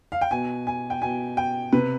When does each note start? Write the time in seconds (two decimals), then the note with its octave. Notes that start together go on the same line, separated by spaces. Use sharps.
0.12 F5
0.21 G5
0.31 B2 G#5
0.67 G#5
0.90 G5
1.02 B2 G#5
1.37 G5
1.72 C3 B4